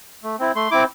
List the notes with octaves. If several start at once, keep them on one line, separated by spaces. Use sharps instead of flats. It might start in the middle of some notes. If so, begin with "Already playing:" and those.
A3
C4 E4
A3 C6
C4 E4 D6